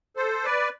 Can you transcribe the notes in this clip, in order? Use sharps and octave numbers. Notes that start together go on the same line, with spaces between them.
A4 C5
B4 D5